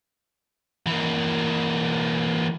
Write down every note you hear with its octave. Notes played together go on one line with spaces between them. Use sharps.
E3 A#3